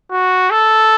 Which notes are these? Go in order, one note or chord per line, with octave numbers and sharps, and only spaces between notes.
F#4
A4